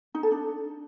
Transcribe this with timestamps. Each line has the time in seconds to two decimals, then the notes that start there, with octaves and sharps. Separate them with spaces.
0.15 D#4
0.23 A4
0.32 D4